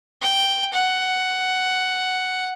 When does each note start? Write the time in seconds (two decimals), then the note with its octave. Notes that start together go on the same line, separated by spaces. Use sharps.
0.22 G5
0.73 F#5